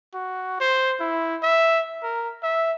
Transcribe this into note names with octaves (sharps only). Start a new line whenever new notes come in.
F#4
C5
E4
E5
A#4
E5